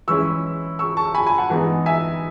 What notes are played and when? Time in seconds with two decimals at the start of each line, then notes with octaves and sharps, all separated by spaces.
0.08 E3 G#3 C#4 E4 C#6 E6
0.79 C#6 E6
0.97 A5 C#6
1.15 G#5 B5
1.26 G#5 B5
1.38 F#5 A5
1.50 E3 G#3 B3 D#4
1.86 E5 G#5